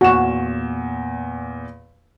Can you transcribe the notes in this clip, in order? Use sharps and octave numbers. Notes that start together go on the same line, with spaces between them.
E2 A#2 F#4 E7